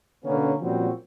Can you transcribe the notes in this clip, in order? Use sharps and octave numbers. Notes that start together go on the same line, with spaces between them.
B2 D3 A#3 B3 C#4
A#2 F3 G3 C4 C#4 F#4